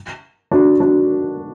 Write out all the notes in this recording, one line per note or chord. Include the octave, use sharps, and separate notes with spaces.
D4 F#4
D4 F#4